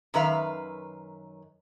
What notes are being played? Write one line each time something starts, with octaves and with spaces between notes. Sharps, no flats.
F#2 D#3 B4 E5 F5